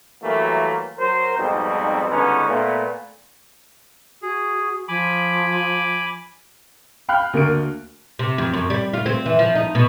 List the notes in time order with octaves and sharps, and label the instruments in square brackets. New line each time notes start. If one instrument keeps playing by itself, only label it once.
[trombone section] E3 F#3 G3 A3 A#3
F#3 A#4 C5
F2 G#2 B2 G3 C4 D#4
C#2 G2 D3 B3 C#4 D#4
A#2 A3 B3
[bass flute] F#4 [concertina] G#4
[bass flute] F3 [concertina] G#5 B5 D6
[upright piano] F5 G5 B5 F6 F#6
D2 A#3 F#4 A#4 D7
[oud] C3
F2
F#2
G3
F4
C4
E3
F3
D#4
B2